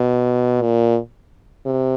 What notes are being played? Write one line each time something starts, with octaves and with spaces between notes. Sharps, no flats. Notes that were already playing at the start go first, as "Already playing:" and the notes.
Already playing: B2
A#2
C3